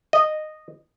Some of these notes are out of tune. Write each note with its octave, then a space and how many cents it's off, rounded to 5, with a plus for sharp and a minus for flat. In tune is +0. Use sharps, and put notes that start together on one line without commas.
D#5 -10